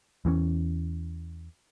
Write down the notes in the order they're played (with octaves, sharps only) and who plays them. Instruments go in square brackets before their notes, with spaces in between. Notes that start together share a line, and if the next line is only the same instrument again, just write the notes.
[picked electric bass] E2 E3 G3 C#4